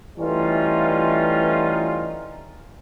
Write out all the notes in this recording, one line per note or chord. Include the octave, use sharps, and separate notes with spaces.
E3 G3 A3 C#4 D#4 F4